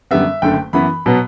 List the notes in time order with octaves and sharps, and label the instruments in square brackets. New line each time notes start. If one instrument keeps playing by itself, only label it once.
[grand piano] F#2 D3 G3 B3 E5
F#1 F#2 D3 A3 G5
F#2 E3 B3 B5
B2 F#3 B3